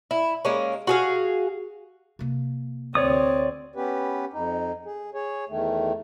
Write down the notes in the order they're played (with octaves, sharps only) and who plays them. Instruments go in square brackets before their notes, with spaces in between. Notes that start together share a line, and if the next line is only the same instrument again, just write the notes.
[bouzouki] E4
G#3 A#3 C#4
F#4 G#4 F5
[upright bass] C3 A#3
[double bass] D2 C4 [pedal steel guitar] C#5 D5 D#6
[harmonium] B3 C#4 G4 B4
F2 D#4
G#4
G#4 C#5
E2 D#3 A3